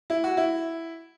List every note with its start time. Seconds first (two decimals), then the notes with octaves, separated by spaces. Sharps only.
0.10 E4
0.24 F#4
0.37 E4